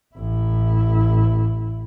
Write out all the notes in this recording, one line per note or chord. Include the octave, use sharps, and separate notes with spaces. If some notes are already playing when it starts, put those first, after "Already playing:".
A1 E4